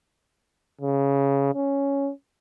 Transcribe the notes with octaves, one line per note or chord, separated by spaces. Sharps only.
C#3
C#4